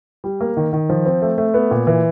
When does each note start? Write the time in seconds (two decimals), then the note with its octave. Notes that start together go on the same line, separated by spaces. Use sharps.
0.24 G3
0.41 A#3
0.57 D#3
0.73 D#3
0.89 F3
1.06 C4
1.22 A3
1.38 A3
1.54 B3
1.71 A#2
1.87 E3